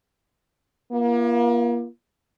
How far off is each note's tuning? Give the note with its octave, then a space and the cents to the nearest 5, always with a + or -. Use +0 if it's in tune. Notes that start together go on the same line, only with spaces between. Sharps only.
A#3 +35 F4 -30